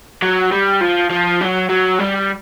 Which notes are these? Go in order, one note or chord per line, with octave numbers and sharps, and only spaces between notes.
F#3
G3
F3
F3
F#3
F#3
G3